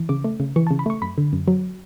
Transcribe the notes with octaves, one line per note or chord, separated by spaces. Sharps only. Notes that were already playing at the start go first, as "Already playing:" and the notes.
Already playing: E3
C#3 D6
A3
C#3
E3 C#6
C#3 A5
B5
A3 C#6
F#2 B5
D3
F#2
F#3